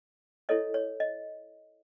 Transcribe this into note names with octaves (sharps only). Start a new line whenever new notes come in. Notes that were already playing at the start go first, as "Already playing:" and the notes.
E4 A4 C#5 D#5
C#5
D#5